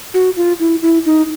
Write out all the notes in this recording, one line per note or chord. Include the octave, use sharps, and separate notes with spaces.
F#4
F4
E4
E4
D#4